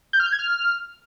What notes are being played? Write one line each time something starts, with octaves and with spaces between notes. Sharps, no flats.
G6
F6
G6
G#6
F6